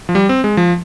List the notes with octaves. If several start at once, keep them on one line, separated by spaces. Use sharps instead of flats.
F3
G3
C4
G#3
F3